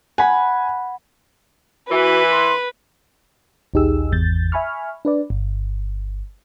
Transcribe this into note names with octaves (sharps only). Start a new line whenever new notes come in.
F#5 G#5 B5
E3 F#4 B4
C6
A#1 D#2 D#4 G4 G#4 E6
G#1 E2 G6 A6
E5 G#5 B5 C#6 F6
D4 B4 D5
G1